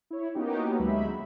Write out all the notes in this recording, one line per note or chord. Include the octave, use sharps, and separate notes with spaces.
E4 C#5
A#3 B3 C#4 D#4 F#4 G4
D2 F#3 G#3 E5 B5